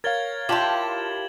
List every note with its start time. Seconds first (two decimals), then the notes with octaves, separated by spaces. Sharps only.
0.04 A#4 C#5 F5 G#6 A6 G7
0.49 E4 F4 G4 A5 C6 E7 F#7